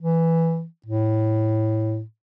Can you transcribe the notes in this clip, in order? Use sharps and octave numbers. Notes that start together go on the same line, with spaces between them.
E3
A2